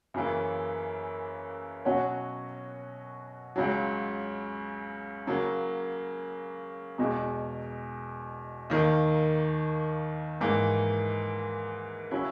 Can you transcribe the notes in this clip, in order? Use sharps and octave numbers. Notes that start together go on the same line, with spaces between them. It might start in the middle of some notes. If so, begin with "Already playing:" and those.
F#2 C#3 E3 A#3
B2 F#3 C#4 F#4 C#5
C#2 C#3 F#3
C#3 F#3 A#3
E2 B2 G#3
D#2 D#3 A#3
G#2 E3 A#3
C#3 F#3 C#4 E4